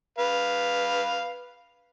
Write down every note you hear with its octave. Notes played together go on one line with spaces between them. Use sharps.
B4 F5